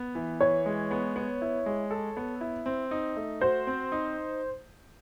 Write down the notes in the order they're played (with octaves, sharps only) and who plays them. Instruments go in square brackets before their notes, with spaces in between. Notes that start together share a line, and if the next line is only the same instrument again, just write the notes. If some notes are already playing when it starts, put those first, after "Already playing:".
Already playing: [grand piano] B3
E3
[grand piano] E3 [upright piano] C#5
[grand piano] G#3
B3
B3
E4
G#3
A4
B3
E4
C4
D#4
A3
[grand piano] F#4 [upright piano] C5
[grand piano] C4
D#4